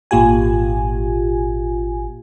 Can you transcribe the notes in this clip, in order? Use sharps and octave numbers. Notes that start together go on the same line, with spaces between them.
G#1 A#2 F4 G4 G#5